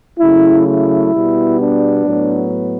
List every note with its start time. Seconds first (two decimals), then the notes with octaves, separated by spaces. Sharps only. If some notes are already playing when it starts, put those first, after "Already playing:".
0.18 C#3 F#3 A3 E4
0.66 E4
1.13 B2 G3 B3
1.60 D4
2.06 A2 F#3 B3